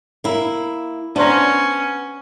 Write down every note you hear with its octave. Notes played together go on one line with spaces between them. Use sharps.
A#3 E4
B3 C#4 D4 C5 A#5